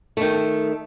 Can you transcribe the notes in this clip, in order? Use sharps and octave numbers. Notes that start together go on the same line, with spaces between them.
D#3 A3